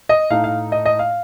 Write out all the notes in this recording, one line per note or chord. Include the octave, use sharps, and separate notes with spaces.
D#5
A2 A3 D#4 F5
F5
D#5
D#5
F5